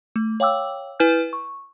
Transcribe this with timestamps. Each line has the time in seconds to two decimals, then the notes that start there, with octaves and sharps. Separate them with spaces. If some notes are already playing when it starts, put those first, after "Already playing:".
0.16 A3
0.40 C#5 F5 G5 D6 E6
1.00 E4 B4 G#5 F6 G6
1.33 C#6